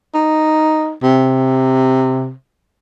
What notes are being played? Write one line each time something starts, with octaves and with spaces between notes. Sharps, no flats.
D#4
C3